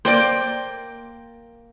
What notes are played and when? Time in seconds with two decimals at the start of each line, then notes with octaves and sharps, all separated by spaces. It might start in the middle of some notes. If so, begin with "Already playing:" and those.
0.05 A#3 C5 D5 G5